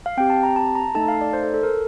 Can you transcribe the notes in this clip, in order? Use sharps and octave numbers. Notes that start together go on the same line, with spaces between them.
F5
C4 G4 G5
A5
A#5
A5
A#5
A3 D#4 A4 A5
F5
D5
C5
A4
A4
A#4